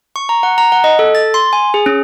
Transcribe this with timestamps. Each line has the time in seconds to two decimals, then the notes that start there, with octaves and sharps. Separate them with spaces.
0.16 C#6
0.29 A#5
0.43 F#5
0.58 A#5
0.72 F#5
0.84 D#5
0.99 A4
1.15 A6
1.34 C6
1.53 G#5
1.74 G#4
1.86 C#4